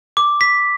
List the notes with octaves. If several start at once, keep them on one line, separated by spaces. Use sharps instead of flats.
D6
B6